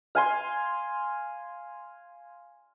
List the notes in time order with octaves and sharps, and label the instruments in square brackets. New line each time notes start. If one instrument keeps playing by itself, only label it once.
[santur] F5 G#5 C6